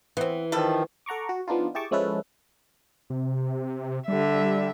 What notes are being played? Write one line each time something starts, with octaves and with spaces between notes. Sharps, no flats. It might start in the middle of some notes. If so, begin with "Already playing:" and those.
E3 B3 C4
D#3 F3 G3 A4 B4
A4 F#5 A#5 C#6 D6
F#4
F3 B3 D4 D#4 F4
E4 G4 G#4 A5 C#6 D6
F3 G#3 C#4 E4 A4 B4
C3
D3 G3 E5